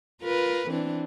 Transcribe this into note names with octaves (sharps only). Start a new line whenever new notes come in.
F4 A#4 B4
E3 C4 D4